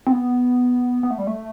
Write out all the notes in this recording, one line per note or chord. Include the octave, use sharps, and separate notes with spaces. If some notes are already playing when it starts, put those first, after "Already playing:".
C4
B3
B3
A3
G3
A3